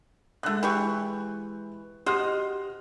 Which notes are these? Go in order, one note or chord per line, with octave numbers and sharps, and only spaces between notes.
D3 G#3 A3 F#6
E3 G4 C#6
F#4 G4 C5 D#5 F6